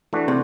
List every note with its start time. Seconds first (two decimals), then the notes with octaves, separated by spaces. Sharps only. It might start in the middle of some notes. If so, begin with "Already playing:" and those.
0.13 E3 A3 D4 F#4
0.28 C3